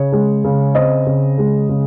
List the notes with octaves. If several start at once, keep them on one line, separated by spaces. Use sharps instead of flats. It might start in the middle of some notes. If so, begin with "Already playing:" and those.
Already playing: C#3 C#5
G#3
C#3
C4 D#5
C#3
G#3
C#3